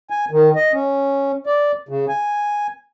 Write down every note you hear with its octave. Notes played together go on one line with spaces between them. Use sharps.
G#5
D#3
D#5
C#4
D5
C#3
G#5